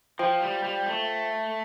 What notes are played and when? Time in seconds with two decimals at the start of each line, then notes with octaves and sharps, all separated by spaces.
0.19 F3 F4 C5 G5
0.42 G3
0.64 G3
0.86 A3